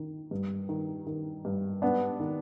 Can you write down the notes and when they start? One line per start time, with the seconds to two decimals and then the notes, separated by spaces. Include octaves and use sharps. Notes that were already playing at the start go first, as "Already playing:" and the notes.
Already playing: D#3
0.31 G2
0.69 D#3
1.07 D#3
1.45 G2
1.82 G#2 B3 D4
2.20 D#3